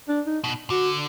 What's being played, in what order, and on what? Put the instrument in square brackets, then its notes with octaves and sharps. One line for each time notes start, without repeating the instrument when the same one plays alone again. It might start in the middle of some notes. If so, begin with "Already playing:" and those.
[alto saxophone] D4
D#4
[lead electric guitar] B2
[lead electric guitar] D3 [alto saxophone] F#4